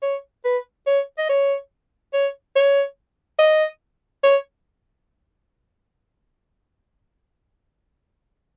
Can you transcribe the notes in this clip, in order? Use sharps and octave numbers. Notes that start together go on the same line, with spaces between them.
C#5
B4
C#5
D#5
C#5
C#5
C#5
D#5
C#5